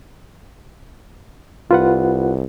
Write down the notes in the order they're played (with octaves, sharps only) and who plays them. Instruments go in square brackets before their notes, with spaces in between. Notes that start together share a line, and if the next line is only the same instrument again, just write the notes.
[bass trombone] C2 [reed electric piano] F4 B4 F#5